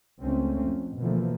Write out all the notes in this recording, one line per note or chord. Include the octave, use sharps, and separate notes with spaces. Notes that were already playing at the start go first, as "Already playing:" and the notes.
C#2 A3 C4 C#4
F2
B2 D3 E3 F3 A3 A#3